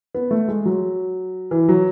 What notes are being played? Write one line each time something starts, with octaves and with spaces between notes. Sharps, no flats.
B3
A3
G#3
F#3
E3
F#3